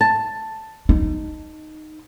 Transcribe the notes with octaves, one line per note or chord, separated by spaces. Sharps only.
A5
D#4